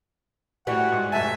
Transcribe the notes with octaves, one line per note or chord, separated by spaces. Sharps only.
A2 E3 G3 F#4 F#5
G#2
F1 E5 G#5 A5